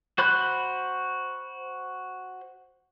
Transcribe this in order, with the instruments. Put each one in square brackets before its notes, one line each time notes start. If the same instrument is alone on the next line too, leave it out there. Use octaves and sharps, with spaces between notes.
[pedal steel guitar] F#4 C5 B5 F#6